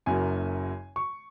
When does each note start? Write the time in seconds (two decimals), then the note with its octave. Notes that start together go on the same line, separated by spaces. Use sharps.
0.06 F#1 F#2 F#3 A#3 G#5
0.96 C#6